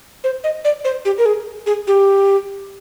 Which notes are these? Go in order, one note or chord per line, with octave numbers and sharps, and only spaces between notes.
C5
D#5
D5
C5
G4
A#4
G#4
G#4
G4